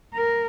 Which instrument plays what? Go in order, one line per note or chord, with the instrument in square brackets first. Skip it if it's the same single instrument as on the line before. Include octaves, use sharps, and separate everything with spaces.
[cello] A#4